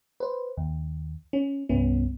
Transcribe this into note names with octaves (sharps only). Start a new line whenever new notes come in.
B4 C5
D#2
C#4
C2 G2 B3 C#4